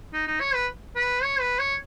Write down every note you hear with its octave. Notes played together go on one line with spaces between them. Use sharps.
D#4
D#4
C#5
B4
B4
C#5
B4
C#5